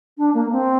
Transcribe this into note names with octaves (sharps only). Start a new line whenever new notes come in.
D4
A#3
C4